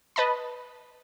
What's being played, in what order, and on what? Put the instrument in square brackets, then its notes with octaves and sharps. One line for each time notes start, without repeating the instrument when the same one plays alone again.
[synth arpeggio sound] B4 D#5 A5 B5